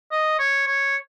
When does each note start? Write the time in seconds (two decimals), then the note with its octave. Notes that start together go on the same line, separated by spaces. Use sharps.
0.12 D#5
0.39 C#5
0.67 C#5